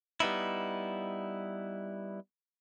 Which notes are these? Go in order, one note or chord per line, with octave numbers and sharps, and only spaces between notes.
G3 B3 D#4 E4